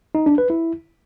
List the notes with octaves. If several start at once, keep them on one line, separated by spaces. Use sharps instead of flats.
D#4
D4
B4
E4